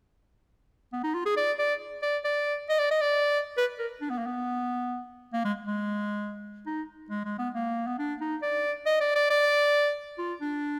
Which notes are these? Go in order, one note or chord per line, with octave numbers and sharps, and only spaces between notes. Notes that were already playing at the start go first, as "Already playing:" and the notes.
B3
D#4
F4
G#4
D5
D5
D5
D5
D#5
D5
D#5
D5
B4
A#4
D4
B3
A#3
B3
A#3
G#3
G#3
D#4
G#3
G#3
B3
A#3
B3
D4
D#4
D5
D#5
D5
D5
D5
F4
D4